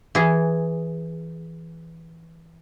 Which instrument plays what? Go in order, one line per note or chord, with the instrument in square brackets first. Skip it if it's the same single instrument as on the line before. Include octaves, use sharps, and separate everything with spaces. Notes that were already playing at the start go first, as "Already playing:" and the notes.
[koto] E3 G#4